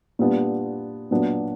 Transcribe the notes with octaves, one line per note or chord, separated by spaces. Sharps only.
A#2 G3 B3 D4
A#2 F#3 B3 D4